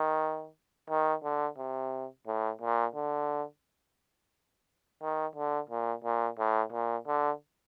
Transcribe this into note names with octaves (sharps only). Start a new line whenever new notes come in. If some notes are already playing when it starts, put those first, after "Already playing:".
Already playing: D#3
D#3
D3
C3
A2
A#2
D3
D#3
D3
A#2
A#2
A2
A#2
D3